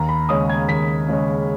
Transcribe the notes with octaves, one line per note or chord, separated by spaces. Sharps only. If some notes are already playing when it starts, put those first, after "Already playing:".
Already playing: D#2 A#5
B5
C#3 G#3 C#4 D#6
G#6
D#2 B6
C#3 G#3 C#4